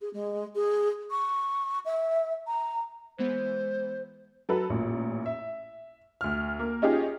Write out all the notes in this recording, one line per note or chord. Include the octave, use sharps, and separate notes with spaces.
G#4
G#3
G#4
C#6
E5
A#5
E3 G#3 B3 C5
F#3 A4 B4
A1 A#2
E5
D2 F6
A#3
C#4 D#4 F4 G4 G#4